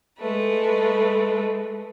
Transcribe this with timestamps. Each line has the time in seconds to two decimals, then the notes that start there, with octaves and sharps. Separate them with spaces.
0.18 G#3 A3 B4